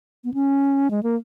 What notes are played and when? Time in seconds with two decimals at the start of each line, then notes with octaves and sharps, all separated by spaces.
0.24 B3
0.34 C#4
0.91 G#3
1.03 A#3